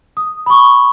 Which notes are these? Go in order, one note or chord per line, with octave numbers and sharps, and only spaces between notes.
D#6
B5
C#6